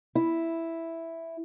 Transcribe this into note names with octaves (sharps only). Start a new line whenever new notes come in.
E4